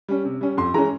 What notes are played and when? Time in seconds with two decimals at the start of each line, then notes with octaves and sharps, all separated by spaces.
0.08 G3 C#4
0.25 C3
0.41 G3 C#4
0.57 F2 C6
0.74 E3 G#3 C#4 A#5